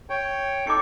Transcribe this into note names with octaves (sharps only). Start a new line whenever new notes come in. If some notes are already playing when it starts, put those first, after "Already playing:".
C#5 G5
D#4 A4 D6 C#7